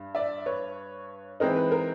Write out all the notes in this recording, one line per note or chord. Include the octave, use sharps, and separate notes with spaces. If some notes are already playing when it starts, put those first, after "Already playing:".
Already playing: G2
D5 E5
B4 C#5
E3 G#3 C4 D#4 A#4
B4
A#4